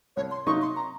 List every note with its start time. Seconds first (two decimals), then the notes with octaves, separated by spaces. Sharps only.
0.17 C2 C#5
0.31 C6
0.47 C3 F#3 A#3 D#4 C#6
0.62 C6
0.76 A#5